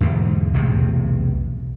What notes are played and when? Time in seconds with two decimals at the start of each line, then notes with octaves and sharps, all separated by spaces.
0.01 E2 G#2 B2 D3
0.54 B1 E2 A2 C3